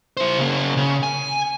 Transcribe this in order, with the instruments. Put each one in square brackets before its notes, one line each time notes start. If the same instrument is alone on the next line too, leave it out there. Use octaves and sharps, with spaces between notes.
[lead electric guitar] E4 C5
C#3 A#3
C#3
G#5